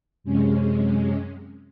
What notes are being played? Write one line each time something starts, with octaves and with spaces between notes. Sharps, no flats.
F#2 C3 G#3 C#4